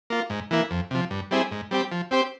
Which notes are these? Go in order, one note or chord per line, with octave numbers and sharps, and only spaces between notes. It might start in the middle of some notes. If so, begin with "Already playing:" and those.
A#3 F4
G#2
E3 A#3 E4
F2
C3 F3
G2
G3 C4 E4 G#4
G#2
G3 C4 G4
F3
C4 G4 C5